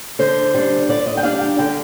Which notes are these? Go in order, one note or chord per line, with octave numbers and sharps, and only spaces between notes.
D3 C5
G3 D4
D3 D5
D#5
G5
G3 D4 F5
G5
D3 G5